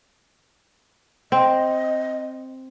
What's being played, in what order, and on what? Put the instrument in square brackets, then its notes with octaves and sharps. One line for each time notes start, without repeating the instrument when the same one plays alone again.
[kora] C4 [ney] D#5